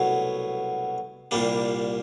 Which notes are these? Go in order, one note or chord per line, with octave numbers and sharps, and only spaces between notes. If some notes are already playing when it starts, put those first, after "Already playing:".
Already playing: C2 B2 F#3 A3
C2 A#2 G3 A#3 D4